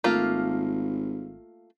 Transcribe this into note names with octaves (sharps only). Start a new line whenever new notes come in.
G#1 A3 A#3 F4